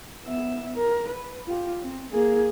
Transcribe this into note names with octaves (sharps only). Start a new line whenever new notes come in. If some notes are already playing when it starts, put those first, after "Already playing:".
B3 E5
A#4
B4
F4 G4
C4
A#3 G#4